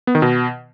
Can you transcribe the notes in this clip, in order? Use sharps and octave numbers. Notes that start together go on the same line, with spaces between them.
B3
D#3
B2